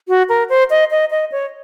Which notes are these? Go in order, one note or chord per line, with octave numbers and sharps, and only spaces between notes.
F#4
A#4
C5
D#5
D#5
D#5
C#5